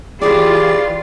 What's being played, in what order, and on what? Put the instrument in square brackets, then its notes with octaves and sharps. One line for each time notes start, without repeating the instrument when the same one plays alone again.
[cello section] E3 F4 [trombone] G4 [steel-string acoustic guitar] G#4 B4 [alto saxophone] D5